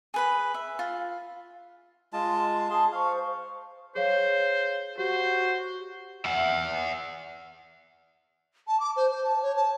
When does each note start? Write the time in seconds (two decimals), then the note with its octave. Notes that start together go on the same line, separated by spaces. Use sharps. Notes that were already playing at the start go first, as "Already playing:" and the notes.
0.14 G#4 B4 B5
0.54 E5
0.79 F4
2.13 G#3 F4 A5
2.52 C6
2.70 G#4 A5 C6
2.92 C5 F5 C#6
3.95 G#4 C5 C#5 F5
4.98 F#4 G4 C5
6.25 E5 F#5
8.67 A5
8.79 D6
8.96 C5
9.11 C5
9.24 A5
9.42 C#5
9.56 A5